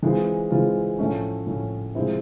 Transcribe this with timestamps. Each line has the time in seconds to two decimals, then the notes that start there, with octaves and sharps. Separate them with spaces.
0.02 E3 G#3 C4 F4
0.51 E3 G#3 C4 F4
0.98 A2 F3 A3 C#4
1.46 A2 F3 A3 C#4
1.95 C3 F3 G#3 C4 E4